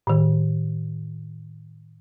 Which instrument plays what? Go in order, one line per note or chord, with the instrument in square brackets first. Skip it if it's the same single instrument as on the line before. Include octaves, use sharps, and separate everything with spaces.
[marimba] A2 D#3